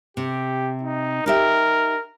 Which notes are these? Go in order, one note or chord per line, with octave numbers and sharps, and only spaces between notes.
C3 G4
D#4
D#4 G4 A#4 E5